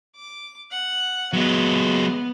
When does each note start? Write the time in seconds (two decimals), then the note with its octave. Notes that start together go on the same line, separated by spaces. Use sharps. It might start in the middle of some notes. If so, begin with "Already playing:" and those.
0.16 D6
0.71 F#5
1.33 F#3 G#3 B3